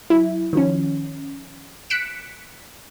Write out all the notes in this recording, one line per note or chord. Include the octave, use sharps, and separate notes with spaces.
F#3 E4
D#3 F3 C#4
F#6 B6 C#7 D7 E7